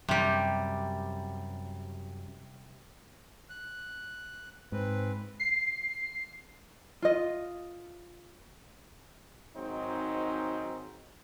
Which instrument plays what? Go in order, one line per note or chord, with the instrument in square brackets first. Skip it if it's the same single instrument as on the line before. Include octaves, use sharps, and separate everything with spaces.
[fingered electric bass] F#2 [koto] C3 G3
[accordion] F#6
[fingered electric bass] G#2 [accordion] C4 B4
[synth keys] C7
[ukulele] F4 D#5
[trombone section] G#1 G#2 F#3 C4 D#4